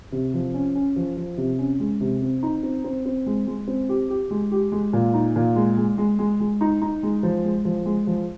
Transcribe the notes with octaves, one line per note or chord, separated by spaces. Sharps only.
C3
F3
C#4
C#4
F3
F3
C3
C#4
G#3
C3
C4
D#4
C4
C4
C4
G#3
G#3
C4
G4
G4
G#3
G4
G#3
A#2
D#4
A#2
G#3
G#3
G#3
G#3
G#3
D#4
D#4
G#3
F3
G#3
F3
G#3
F3